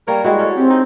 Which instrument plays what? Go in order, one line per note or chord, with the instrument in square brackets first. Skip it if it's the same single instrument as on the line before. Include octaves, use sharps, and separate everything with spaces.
[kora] G3 A#3 C#5 [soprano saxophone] A#4
[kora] G3 G#3 E4 [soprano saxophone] F#4
[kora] C#4 A4 C#5
[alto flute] C4 [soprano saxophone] G4
[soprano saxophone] D#4